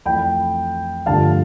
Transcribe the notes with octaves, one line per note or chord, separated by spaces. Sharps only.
F2 E3 A3 G5 B5
G2 D3 F3 A3 F5 A5